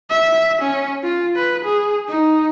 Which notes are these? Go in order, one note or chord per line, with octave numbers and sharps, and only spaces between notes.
E5
C#4
F4
B4
G#4
D#4